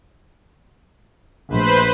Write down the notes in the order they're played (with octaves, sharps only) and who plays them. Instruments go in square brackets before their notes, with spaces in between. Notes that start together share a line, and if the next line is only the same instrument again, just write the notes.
[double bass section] A#1 A3 [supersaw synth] B4 C5 B5